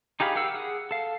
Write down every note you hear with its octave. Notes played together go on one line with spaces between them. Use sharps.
D#4 G4 G#4 F5 B5
G4 A#4 F5 F#5 E6
G#4 F#5
A4 F5